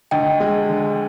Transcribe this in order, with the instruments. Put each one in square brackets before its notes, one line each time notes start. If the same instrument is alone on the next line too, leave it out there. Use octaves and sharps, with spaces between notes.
[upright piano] D2 [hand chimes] D#5 G5
[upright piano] G#3
D3